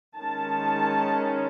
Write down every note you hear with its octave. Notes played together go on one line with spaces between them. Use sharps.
D#3 G#3 C#4 A5